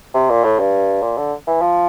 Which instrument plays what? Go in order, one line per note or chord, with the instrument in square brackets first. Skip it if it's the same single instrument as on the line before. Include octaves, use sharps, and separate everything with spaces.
[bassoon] C3
A#2
A2
G2
A#2
D3
E3
F3